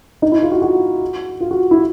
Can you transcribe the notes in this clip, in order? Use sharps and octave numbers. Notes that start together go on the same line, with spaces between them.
D#4
E4
F4
F#4
F#4
F4
F#4
E4